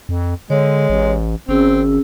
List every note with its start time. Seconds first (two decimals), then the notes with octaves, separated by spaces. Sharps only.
0.09 F2
0.50 D3 G#3 C#5
0.90 A1
1.49 G#1 C4 C#4 G#4 E6